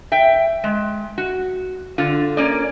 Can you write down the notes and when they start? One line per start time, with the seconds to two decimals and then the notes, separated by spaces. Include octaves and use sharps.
0.12 E5 G5
0.64 G#3
1.18 F#4
1.98 D3 F4
2.37 A#3 C#4 D5